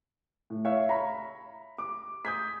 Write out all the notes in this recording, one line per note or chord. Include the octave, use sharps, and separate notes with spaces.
A2
C#5 E5 F5
A#5 B5
D6
D#6 G6 G#6 B6